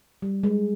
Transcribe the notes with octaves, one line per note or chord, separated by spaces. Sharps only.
G3
G#3